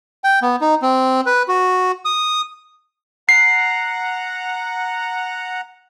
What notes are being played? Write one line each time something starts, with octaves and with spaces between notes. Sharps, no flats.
G5
B3
D#4
C4
B4
F#4
D#6
F#5 A#5 C7